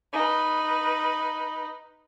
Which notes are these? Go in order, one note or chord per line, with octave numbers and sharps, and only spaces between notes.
D#4 B4